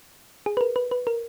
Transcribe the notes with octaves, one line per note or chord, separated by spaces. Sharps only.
G#4
B4
A#4
B4
B4
A#4